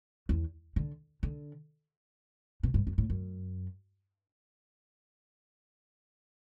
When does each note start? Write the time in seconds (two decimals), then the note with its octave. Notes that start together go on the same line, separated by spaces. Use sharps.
0.29 E2
0.76 D3
1.23 D3
2.63 B2
2.74 G2
2.87 F#2
2.98 A2
3.10 F#2